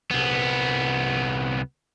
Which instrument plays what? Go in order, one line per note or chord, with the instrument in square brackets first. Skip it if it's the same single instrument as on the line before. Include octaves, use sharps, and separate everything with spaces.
[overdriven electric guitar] C2 B3